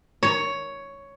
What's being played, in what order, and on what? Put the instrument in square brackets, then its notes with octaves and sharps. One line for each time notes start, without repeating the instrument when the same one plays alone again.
[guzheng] C#5